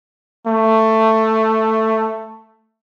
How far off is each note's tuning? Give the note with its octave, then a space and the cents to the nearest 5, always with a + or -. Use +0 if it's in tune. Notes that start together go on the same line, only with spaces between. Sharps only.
A3 +10